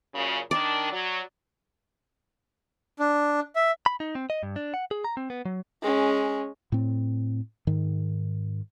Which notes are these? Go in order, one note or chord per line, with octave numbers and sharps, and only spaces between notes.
F#2 A#2 C#3
D#3 D4 D5
F#3
D4
E5
B5
D#4
C4
D#5
G2
D4
F#5
G#4
A#5
C4
B3
F#3
G#3 C#4
A2 C4
G#2 D#3